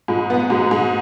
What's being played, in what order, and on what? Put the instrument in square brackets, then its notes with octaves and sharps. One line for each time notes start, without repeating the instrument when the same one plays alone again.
[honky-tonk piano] G#2 [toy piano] F4
[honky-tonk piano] B3
[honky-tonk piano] G#2 [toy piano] F#4
[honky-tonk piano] G#2